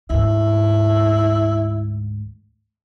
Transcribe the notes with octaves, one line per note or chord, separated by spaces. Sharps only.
D2 G#2 E4